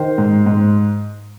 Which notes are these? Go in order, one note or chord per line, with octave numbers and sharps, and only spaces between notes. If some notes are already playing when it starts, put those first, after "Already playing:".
Already playing: D#3 C5
G#2
G#2